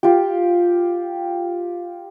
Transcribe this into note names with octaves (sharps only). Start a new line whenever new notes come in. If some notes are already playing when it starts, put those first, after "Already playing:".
F4 G4